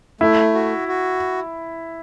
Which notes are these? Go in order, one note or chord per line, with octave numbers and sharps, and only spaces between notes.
A3 E4
F#4
F#4